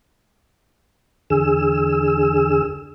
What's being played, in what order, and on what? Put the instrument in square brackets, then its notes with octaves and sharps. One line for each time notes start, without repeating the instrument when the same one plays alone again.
[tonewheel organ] E2 D3 G#4 E6